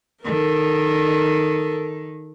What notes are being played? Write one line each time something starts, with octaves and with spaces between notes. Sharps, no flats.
D#3 A4 A#4